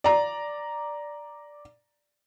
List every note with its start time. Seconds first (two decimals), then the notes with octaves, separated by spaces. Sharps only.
0.04 D5 A#5